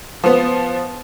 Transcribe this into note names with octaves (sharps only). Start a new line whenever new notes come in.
F3 B3